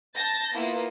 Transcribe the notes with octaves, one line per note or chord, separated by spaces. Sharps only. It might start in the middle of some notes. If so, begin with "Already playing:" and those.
A5 G6 A6 A#6
A#3 B3 E4 F4